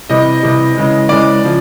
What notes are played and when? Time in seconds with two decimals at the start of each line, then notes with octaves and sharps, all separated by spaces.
0.09 C3 E3 G3 D#5
0.43 C3 E3 G3
0.76 C#3 E3 G#3
1.09 C#3 E3 G#3 D5
1.44 C#3 F3